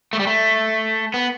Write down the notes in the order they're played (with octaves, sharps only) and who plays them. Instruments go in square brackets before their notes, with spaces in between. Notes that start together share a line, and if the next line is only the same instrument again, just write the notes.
[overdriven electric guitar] A3
G3
A3
B3